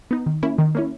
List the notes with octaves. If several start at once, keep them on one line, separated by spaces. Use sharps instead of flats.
B3 D#4
D#3
A#3 C#4 E4
D#3
A#3 C#4 E4